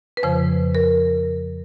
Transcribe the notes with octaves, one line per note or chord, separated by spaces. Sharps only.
B4
F2 C#3 F3 C5
A#4